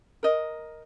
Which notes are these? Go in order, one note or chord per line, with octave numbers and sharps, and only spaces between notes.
A#4 D#5